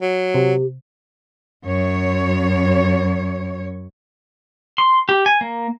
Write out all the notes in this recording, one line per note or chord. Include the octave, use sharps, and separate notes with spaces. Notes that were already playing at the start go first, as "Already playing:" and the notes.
F#3
C3 G4
F#2 C#5
C6
G4
G#5
A#3